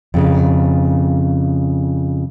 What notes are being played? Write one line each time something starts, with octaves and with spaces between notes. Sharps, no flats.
F2 C#3